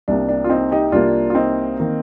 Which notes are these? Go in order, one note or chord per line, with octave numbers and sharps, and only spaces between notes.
C2 C3 G3 A#3 D4
D4
F4
C4 D#4
D#4 G4
C2 C3 G3 A#3 D4 F4
F4
C4 D#4
D#3 A#3